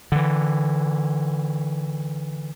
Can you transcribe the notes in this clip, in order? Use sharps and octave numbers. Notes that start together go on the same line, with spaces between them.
D3 E3